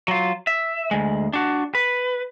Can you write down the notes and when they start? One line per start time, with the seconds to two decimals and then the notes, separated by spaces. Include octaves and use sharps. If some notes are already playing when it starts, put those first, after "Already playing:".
0.08 F#3 F4
0.47 E5
0.91 D2 G#3
1.33 D4 F#4
1.75 B4